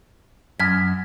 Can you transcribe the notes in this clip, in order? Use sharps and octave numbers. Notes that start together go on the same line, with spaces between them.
F#2 F6 G#6 B6